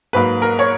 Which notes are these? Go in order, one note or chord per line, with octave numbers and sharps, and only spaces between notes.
G#2 F#3 A#3 B4
A#4
C#5